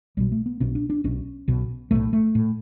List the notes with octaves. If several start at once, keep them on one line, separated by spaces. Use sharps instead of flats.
B1 B2 G3
A3
B3
B1 B2 C#4
D4
D4
B1 B2 C#4
B1 B2
B1 A2 A3
A3
A2